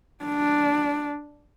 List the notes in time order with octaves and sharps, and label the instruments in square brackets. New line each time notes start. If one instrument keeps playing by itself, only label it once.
[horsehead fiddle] D4